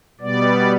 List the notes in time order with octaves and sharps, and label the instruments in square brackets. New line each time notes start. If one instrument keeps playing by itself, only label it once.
[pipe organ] B2 G3 B3 D5